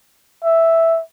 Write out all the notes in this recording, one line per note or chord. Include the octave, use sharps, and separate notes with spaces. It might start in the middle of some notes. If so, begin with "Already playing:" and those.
E5